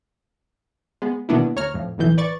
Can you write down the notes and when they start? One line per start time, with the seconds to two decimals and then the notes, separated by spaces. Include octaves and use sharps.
1.02 G#3 B3
1.29 B2 D#3 A#3 B3 D4 E4
1.56 D2 C#5 A#5 F6
1.74 F2 A2
1.98 B1 A2 E3 G6
2.18 B4 D5 C#6 A6